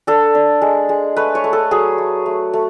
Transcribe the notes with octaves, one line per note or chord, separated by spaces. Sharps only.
D4 A4
D4
G#3
G#3
A3 B4
C#5
A3
A4
F#3 G#4
A3
A3
A3